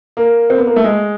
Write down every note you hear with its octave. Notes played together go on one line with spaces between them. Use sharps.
A#3
C4
B3
A#3
A3
G#3